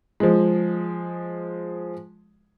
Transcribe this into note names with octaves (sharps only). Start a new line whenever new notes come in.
F3 G#3